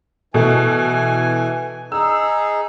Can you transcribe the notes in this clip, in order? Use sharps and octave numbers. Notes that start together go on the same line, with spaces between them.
B2 E3 A3 G#5
D#4 G#4 E6